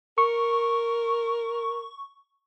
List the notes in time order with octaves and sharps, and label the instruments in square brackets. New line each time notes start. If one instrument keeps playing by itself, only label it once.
[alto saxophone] A#4 [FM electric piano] C#6